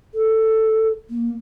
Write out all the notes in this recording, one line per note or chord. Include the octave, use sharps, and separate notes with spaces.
A4
A#3